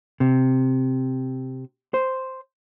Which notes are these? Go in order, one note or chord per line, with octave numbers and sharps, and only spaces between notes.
C3
C5